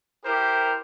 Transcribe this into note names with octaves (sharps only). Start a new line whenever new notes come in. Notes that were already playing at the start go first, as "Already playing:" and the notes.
E4 G4 A#4 C5